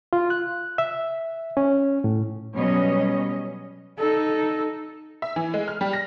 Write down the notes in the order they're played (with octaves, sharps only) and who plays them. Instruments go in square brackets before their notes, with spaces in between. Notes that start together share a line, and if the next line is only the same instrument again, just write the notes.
[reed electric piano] F4
F#6
E5
C#4
A2
[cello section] B2 F#3 G3 C#4 C#5 D#5
[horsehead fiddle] D#4 A4
[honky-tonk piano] E5
E3
G#3
F6
G3
A#6